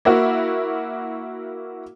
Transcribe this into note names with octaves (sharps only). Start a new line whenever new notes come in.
A#3 E4 F#4